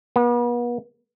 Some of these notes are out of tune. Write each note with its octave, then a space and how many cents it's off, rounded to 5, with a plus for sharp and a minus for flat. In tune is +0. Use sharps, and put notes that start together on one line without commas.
B3 -40